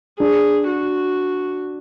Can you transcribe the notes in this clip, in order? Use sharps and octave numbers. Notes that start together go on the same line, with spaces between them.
D4 G#4
F#4